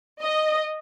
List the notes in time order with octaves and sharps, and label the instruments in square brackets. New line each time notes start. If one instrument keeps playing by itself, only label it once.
[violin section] D#5